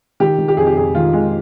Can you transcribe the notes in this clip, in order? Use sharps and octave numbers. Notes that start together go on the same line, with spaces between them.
D#3 G4
D#3
G4
F2 G#4
G4
F2 G#4
D#3 F4
D#3 G#3